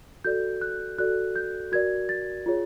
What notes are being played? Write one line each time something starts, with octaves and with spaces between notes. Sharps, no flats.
F#4 A4 D5 G6
F#6
F#4 A4 D5 F#6
G6
F#4 A#4 D5 G#6
A6
F4 G#4 C#5